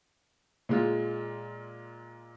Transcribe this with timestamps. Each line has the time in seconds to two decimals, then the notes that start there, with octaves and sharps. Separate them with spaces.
0.69 A#2 G#3 F4